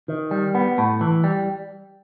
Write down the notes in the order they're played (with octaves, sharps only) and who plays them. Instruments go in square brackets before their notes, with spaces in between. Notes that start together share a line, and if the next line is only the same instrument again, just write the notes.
[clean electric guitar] D#3
G3
B3
A2
E3
G3